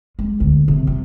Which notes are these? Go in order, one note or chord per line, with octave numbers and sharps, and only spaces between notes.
G#3
D2
C3
C3